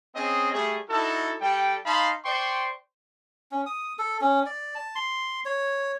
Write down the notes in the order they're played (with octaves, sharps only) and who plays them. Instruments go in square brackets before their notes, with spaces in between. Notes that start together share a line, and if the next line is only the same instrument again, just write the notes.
[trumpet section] C4 C#4 G#4 D#5
G3 A3 G#4
D#4 E4 F#4 A4
G3 A4 G5
D#4 F5 A5 B5 C6
C5 D5 G5 C6 C#6
[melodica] C#4
D#6
A4
C#4
D5
A5
C6
C#5